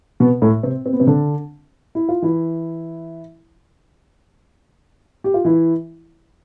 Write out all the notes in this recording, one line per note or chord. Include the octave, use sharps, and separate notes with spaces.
B2 B3
A2 A3
C3 C4
C4
B3
C3 C4
D3 D4
E4
F4
E3 E4
G4
F4
E3 E4